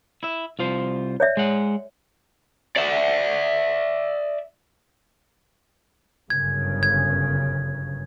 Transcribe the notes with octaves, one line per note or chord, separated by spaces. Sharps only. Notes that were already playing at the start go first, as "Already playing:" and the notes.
E4 E5
C2 F4 C5
C#5 D5 E5
G#3 F#5
D5 E5
G1 F#2 C#3 G#6
G#6